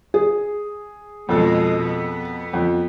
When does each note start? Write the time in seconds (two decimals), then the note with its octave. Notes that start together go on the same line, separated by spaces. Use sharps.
0.14 G#4
1.29 F2 B2 G#3 A4
1.85 B3
2.53 F2